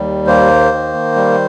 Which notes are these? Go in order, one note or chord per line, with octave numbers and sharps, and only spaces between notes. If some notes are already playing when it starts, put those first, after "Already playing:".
Already playing: D#2 G3
A#3 C5
D#3
G3